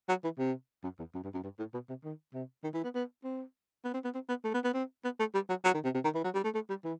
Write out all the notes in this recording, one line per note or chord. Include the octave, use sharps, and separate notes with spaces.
F#3
E3
C3
F#2
E2
F#2
G2
F#2
G2
A2
B2
C3
D#3
C3
D#3
E3
B3
B3
C4
B3
C4
B3
C4
B3
A3
B3
B3
C4
B3
A3
G3
F#3
F#3
D#3
C3
C3
D#3
E3
F#3
G3
A3
A3
G3
E3